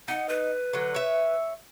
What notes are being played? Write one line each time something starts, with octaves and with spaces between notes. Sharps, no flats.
D#4 F#5
B4
D3 F#3
C#5 E5